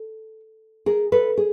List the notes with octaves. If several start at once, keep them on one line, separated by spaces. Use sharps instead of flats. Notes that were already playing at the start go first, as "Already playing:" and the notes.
Already playing: A4
G#4 A#4
A4 B4
G#4